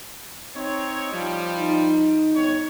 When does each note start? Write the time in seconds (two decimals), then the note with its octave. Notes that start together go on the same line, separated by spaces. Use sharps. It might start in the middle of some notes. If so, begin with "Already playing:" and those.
0.56 C4 D#4 C#5
1.11 F3 G3
1.58 D#4
2.34 G1 C#5